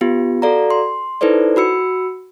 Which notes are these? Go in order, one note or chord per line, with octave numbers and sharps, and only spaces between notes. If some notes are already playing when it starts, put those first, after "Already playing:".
B3 F4 G4
F#4 A4 D5 F5 A#5
C6
D#4 E4 A4 B4 C5 D5
F#4 B5 E6 C#7